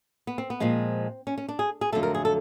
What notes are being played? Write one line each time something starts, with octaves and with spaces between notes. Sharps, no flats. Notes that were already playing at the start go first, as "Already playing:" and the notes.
B3
C4
B3
A#2 F3 G#3 C4
C#4
C#4
D4
G#4
G#4
F2 D3 F#3 A3 A4
A#4
G#4
A4